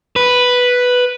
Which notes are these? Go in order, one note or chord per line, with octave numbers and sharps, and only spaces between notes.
B4